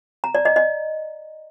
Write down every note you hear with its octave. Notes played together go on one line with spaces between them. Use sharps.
A#5
D5
D#5
D#5